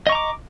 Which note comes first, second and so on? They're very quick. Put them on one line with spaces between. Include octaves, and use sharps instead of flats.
D#5 C#6 A#5 D6